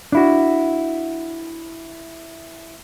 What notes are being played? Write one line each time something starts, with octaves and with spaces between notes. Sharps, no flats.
D4 E4 F#4